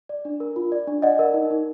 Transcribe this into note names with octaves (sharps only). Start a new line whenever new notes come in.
D5
D4
A#4
F4
D5
D4
D5 D#5 F#5
A#4
D#4
D#4